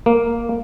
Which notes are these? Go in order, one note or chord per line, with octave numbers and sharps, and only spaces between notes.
A#3